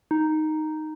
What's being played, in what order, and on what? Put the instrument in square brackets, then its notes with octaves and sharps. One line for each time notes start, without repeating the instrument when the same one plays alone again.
[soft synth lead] D#4